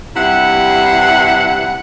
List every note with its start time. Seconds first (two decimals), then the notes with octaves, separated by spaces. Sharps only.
0.17 G2 C3 E4 F#5